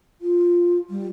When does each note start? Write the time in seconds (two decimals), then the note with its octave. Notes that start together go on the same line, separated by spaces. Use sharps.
0.21 F4
0.90 G3